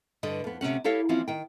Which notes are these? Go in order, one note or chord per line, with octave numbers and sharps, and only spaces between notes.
G2 D3 B4 D#5
F2 B3
D2 C3 A3 C#4 F#5
E4 G4 A4 C#5 F5
E3 F3 A#3 C4 C#4 F4
D#3 G5